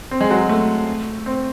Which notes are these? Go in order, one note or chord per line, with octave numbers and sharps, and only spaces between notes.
C4
G#3
F#3
A3
C4